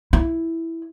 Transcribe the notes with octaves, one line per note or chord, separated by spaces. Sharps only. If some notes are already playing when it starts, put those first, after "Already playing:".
E4